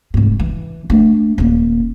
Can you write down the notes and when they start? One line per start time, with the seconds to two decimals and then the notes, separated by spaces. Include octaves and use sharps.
0.14 F1 G#2
0.40 E3
0.90 A3 D4
1.38 D#1 A#3